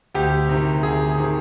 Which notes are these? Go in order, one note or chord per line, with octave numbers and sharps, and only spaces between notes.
D2 G4
C3 D#3
D2 G#4
C3 D#3